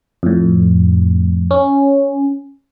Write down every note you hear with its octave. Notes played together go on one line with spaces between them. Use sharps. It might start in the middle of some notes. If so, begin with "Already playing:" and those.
F2 A2
C#4